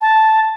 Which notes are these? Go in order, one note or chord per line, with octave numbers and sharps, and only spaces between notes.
A5